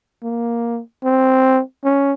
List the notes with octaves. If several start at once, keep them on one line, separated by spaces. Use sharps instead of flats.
A#3
C4
C#4